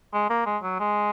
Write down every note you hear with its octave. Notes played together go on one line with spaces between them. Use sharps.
G#3
A#3
G#3
F#3
G#3